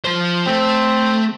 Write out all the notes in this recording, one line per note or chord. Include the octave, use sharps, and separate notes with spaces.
F3 C5
A3 C4